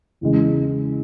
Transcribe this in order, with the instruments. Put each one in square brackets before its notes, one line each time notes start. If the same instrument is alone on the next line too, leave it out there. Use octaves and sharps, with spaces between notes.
[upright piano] E2 C#3 G#3